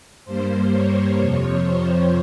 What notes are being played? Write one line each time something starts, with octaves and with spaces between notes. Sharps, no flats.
G2 G3 A#3 C5
C#5
F2 C3 F3 C#5
C5